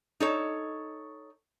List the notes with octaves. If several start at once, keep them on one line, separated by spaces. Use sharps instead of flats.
D#4 A4 C#5